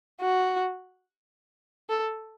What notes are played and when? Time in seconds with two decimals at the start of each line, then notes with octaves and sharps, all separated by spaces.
0.21 F#4
1.89 A4